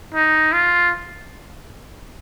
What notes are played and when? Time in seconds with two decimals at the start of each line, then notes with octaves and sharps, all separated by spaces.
0.15 D#4
0.53 F4